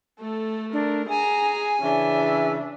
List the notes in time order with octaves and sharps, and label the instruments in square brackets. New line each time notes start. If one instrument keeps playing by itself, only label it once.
[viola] A3 [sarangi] A4
[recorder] D4 [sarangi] A#4
[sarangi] G#4 [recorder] G#5 [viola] A#5
[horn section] C#3 E3 E5 [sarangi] C#4 [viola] D4